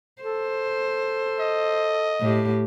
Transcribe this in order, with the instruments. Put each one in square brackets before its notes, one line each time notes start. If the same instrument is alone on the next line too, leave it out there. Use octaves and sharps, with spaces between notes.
[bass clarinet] A4 [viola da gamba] C5
[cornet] D#5
[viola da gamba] A2 G4